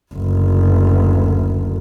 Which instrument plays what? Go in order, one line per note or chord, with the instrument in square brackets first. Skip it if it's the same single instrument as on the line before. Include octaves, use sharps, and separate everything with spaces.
[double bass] F#1 D2